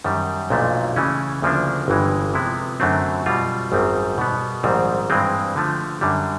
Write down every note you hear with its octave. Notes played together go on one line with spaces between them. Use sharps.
F#2 D#3 G3
B1 A#2 F3 A3 D4
C#3 E3 A3 C#4
D2 C#3 F3 A#3 D4
G1 G2 E3 G#3
C3 F3 G#3 B3 E4
F#2 D3 F#3 A3 C4
B2 G3 C4 F4
G#1 F#2 D#3 G3 C4
B2 G3 B3
A#1 G#2 D#3 G3 C4
G2 E3 G#3 C4
D3 F3 A3
F#2 D3 G3